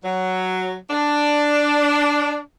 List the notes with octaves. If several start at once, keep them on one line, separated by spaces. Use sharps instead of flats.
F#3
D4